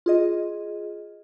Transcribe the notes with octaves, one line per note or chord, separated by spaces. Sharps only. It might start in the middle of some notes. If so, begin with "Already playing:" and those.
F4 G#4 D#5